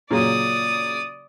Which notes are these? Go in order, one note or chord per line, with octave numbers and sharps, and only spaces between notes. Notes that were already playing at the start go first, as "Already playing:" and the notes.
A#2 C#3 F#3 D5 D#6